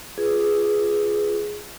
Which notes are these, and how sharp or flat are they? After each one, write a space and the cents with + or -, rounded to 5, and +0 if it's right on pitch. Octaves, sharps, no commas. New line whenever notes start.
F4 -10 G#4 +5 B4 +0